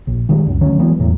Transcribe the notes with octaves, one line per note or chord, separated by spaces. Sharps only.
A#1
D#3 G3 G#3
C#2 F#2
D2 D#3 F#3 C#4
E3 F#3 G#3 B3
E1 E2 A2 F#3